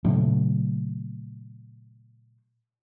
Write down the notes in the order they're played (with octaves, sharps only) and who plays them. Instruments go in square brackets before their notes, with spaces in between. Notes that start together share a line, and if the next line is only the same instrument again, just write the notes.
[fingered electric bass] A#2 C#3 F#3 A3